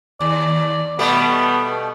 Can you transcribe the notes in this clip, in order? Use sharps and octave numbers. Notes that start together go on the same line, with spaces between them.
D#2 D5
B2 G3 A3 B3